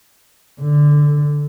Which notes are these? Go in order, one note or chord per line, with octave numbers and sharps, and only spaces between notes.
D3